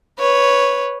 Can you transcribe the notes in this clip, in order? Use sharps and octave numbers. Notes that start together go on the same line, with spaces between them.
B4 C#5